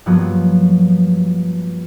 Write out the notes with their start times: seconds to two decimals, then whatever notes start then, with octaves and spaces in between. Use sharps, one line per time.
0.06 G2 F3 F#3 A#3 B3